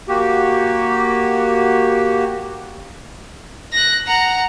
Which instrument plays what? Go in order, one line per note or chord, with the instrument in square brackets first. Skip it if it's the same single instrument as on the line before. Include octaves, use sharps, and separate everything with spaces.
[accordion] A#3 F#4 G4
[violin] F#6 A#6
F#5 A#5